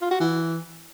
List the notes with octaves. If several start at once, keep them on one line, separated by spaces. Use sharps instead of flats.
F4
F#4
E3